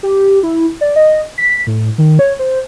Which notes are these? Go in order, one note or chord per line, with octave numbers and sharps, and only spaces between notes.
G4
E4
D5
D#5
B6
A2
D#3
C#5
C5